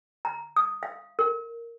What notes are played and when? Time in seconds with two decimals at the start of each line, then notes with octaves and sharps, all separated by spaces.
0.25 A#5
0.56 D#6
0.83 F5
1.19 A#4